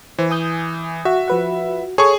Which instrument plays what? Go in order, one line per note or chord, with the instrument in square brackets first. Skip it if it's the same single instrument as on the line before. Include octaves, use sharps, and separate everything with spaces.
[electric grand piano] E3 [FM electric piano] C5
[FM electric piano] G#5 D#6 G6
[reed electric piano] F#4 [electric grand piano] E5
[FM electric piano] F3 B4 F#5
[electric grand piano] G#4 C#6 [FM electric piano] A4 [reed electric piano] C#5